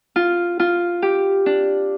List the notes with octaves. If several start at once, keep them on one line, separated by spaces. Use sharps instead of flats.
F4
F4
G4
D4